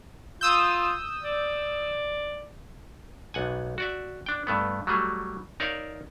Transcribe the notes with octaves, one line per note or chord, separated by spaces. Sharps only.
F4 D#6 E6 G6
D5
B1 F#5 G#5
F#4 D5 E5
D4 G5
G2 A3 B3
F#3 G3 A3 G#4
D#4 A#4 C#5 D5 E5 F5